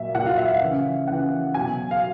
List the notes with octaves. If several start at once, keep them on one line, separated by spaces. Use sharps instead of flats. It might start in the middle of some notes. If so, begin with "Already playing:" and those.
Already playing: A#2 F#3 E5
A#2 F#3 F#5
F5
E5
F5
C#3 E3
C#3 E3 F#5
B2 F#3 G#5
F5